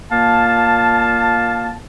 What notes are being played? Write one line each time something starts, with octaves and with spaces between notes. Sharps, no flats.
A#2 A#3 F5 A5